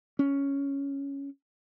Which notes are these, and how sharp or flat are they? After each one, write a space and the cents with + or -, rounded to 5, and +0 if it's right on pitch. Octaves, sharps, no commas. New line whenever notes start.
C#4 +5